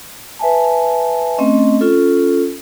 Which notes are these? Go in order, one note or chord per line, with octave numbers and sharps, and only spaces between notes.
B4 E5 G#5 A5
A3 C4 C#4 D#5
C#4 F4 A4